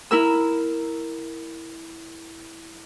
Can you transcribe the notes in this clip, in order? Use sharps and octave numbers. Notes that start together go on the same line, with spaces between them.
E4 A#4 E6